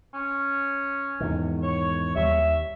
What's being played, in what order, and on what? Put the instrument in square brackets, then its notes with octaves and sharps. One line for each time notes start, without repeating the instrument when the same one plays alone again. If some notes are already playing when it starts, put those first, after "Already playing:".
[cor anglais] C#4
[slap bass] E2 G#2 D#3
[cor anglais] C#5
[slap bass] D#2 G3 [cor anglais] E5